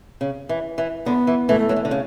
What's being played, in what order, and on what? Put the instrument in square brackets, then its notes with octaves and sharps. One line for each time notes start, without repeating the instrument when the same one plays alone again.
[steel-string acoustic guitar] C#3
E3
E3
[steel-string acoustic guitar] D3 [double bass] B3
[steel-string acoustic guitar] E3
[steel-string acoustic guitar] E3 [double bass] A3
[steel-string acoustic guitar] F#3
E3
D3
C#3